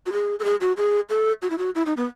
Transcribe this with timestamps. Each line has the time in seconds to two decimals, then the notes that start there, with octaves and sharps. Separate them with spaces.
0.06 F#4
0.12 G#4
0.40 A4
0.44 G#4
0.61 F#4
0.77 G#4
1.10 A4
1.42 F#4
1.50 E4
1.58 F#4
1.75 E4
1.86 D#4
1.97 B3